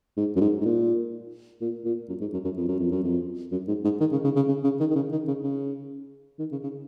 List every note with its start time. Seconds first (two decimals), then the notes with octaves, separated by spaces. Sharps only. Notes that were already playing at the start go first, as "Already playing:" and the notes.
0.17 G#2
0.36 F#2
0.41 G#2
0.61 G#2
0.65 A#2
1.61 A#2
1.85 A#2
2.09 F#2
2.20 G#2
2.33 F#2
2.44 F#2
2.57 F2
2.68 F#2
2.79 F2
2.91 F#2
3.03 F2
3.52 F#2
3.67 G#2
3.84 G#2
4.00 D#3
4.12 C#3
4.24 C#3
4.36 C#3
4.48 C#3
4.64 C#3
4.80 D#3
4.90 D#3
4.96 C#3
5.12 D#3
5.27 C#3
5.43 C#3
6.39 D#3
6.52 C#3
6.63 C#3